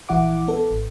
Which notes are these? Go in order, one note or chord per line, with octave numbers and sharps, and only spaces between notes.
A#1 E3 E4 F#5 D6
B3 A4
G#1